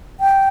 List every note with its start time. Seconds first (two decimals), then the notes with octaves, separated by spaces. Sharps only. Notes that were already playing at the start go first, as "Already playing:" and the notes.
0.20 G5